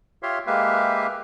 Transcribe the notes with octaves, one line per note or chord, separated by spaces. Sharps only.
F4 G4 C#5 E5 F5 C6
G#3 A#3 G4 B4 E5 F5